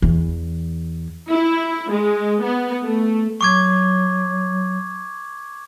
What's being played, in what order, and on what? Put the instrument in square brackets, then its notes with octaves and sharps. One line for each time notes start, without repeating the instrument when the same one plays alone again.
[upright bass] E2 E3
[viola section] E4
G#3
B3
A3
[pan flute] F#3 [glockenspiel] C#6 D6 G#6